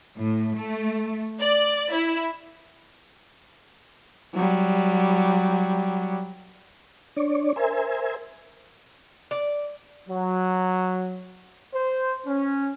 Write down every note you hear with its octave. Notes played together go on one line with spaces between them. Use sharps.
A2
A3
D5
E4
F#3 G3
D4 C#5 D5
A#4 C5 E5 G#5
D5
F#3
C5
C#4